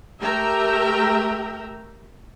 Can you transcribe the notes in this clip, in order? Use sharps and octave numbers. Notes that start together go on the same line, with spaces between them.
A3 G4 A#4 E5 G5 A#5